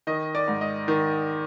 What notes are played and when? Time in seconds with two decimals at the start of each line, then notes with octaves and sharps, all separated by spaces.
0.07 D#3 D#5
0.35 D5
0.48 G#2
0.61 D#5
0.88 D#3